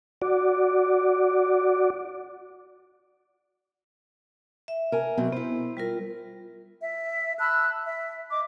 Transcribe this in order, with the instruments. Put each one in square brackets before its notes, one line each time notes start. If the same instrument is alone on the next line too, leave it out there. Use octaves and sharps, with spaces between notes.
[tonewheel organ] F#4 D5
[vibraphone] E5
[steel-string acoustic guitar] A#4 G#5
B2 F#3 C4
[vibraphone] B3 [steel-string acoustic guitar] E4 C5
[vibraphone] G3 F4 A#4
[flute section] E5
A5 B5 E6 F#6
E5
D#5 D6